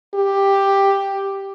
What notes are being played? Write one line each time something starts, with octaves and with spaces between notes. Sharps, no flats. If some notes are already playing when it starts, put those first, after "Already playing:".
G4